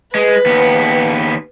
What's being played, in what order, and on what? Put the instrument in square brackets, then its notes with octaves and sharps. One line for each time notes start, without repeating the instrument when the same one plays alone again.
[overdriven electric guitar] G#3 [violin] B4
[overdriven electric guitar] D#2 B3